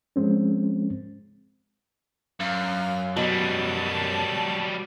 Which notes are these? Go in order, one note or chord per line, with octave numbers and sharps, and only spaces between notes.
F3 G#3 C4 C#4
F#2 F5
B2 F#3 G3 A5